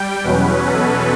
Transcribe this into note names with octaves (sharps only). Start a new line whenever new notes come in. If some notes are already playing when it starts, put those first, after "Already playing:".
Already playing: G3 G5
E2 B2 F#3 C#4 B4
A4